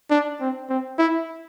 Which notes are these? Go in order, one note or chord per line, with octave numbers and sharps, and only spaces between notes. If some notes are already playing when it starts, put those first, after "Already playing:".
D4
C4
C4
E4